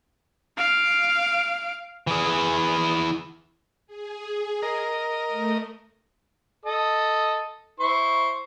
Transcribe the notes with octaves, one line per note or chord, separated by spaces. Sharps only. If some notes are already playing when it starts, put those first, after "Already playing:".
F5 D7
E3 G#4
G#4
A#4 D#5
A3
A4 D#5 D#6
E4 C5 C#6